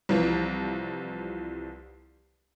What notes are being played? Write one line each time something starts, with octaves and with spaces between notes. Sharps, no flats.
C2 E3 F3